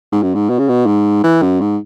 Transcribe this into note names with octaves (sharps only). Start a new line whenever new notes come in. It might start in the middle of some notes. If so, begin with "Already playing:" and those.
G#2
F#2
G#2
B2
C#3
B2
G#2
E3
F#2
G#2